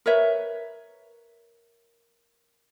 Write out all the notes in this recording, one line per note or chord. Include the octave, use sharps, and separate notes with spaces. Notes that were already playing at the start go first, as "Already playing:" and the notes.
A#4 B4 C#5 E5